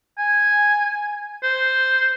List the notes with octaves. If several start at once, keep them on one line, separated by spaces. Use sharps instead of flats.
G#5
C5